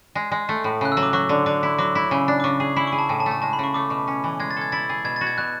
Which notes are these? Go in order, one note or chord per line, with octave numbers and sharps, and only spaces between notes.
G#3
G#3
A3
A2
C#3 F#6
E6
F#3
D6
F#3 C#6
D3
D3 D6
E4
F#3 D6
E4
C#3
D4
D6
C#3 C#6
G#4
E4 B5
C#6
G#4
A5
A2 G#5
A5
A3
A5
G#3 A5
B5
C#3 C#6
A3 D6
B2
C#4
E3
G#3 G#6
A6
A4 G#6
E4 A6
G#4
B2 G#6
A6
F#4
G#6
B2 F#6